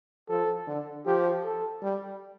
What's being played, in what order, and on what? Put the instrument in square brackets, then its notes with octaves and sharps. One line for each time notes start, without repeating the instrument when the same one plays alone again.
[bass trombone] F3 [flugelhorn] A4
[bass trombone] D3
[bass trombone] F3 [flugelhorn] G4
[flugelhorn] A4
[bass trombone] G3